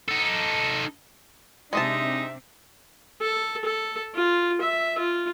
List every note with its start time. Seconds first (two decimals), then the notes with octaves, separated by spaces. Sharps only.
0.08 D#4 A4
1.73 C3 G#3 C4 D4 D#4 D#5 E5 A5
3.21 A4
3.65 A4
4.15 F4
4.61 E5
4.98 F4